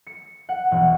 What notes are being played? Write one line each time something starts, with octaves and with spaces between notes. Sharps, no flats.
C#7
F#5
E1